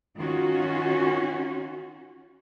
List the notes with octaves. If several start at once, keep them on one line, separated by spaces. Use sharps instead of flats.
D#3 C#4 F4 F#4